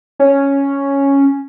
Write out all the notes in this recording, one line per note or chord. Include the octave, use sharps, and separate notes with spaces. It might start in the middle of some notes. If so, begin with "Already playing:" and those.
C#4